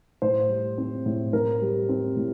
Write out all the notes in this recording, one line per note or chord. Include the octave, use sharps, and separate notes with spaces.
A2 C5
G3
C4
A2
A2 A#4
G3
C4
A2